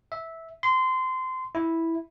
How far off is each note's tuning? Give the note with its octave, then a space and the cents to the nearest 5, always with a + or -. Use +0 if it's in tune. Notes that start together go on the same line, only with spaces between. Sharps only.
E5 -10
C6 -20
E4 -5